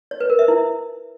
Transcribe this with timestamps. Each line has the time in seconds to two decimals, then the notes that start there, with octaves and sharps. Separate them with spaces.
0.11 C#5
0.20 B4
0.30 A#4
0.39 E5
0.48 E4